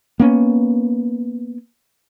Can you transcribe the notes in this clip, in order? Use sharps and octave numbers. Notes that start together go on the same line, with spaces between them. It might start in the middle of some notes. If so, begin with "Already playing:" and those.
A#3 B3 C#4